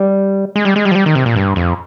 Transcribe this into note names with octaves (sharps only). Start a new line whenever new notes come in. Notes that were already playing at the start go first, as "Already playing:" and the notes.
Already playing: G3
G#3
G3
G#3
G3
F3
G3
D#3
C3
A#2
G2
F2